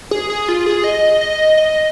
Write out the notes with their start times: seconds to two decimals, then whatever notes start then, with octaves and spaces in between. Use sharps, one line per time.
0.11 G#4
0.30 G#4
0.48 F4
0.66 G#4
0.84 D#5
1.21 D#5
1.57 D#5